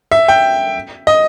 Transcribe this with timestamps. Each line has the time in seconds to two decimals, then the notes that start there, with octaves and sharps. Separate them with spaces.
0.12 E5
0.28 G5
1.07 D#5